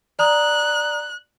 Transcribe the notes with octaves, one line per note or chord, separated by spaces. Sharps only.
D5 A#5 D#6 F#6